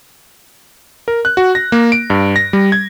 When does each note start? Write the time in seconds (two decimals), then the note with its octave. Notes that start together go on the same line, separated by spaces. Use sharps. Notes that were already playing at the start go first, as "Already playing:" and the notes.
1.08 A#4
1.25 F#6
1.37 F#4
1.55 A#6
1.72 A#3
1.92 D7
2.10 G2
2.36 A#6
2.53 G3
2.72 G#6